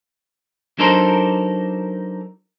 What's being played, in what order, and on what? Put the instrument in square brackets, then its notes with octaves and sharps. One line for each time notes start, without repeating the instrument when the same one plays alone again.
[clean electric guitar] F#3 D4 D#4 A4 A#4 C5